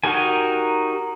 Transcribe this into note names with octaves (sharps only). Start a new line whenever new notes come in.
D#4 F#4 G4 A#4 G#5